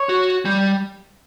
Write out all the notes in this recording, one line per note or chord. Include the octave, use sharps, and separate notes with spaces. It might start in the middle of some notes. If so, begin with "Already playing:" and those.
Already playing: C#5
F#4
G3